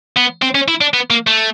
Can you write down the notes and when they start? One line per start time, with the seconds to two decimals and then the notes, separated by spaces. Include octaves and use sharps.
0.16 B3
0.42 C4
0.55 C#4
0.68 E4
0.81 D4
0.94 B3
1.10 A#3
1.27 A3